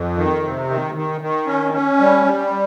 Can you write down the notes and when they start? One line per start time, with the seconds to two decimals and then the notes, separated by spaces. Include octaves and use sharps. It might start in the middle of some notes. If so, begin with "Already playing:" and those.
Already playing: F2
0.17 D#3
0.43 C3
0.70 D#3
0.95 D#3
1.21 D#3
1.47 C#4
1.73 C#4
2.00 G3
2.25 G3